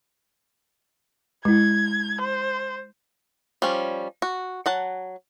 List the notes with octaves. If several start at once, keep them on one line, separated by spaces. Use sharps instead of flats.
G#3 E4 G#6
C5
F3 G3 C#4
F#4
F#3 F#5 A5